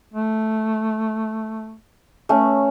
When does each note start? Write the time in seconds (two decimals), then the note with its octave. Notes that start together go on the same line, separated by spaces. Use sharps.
0.14 A3
2.29 A3 C#4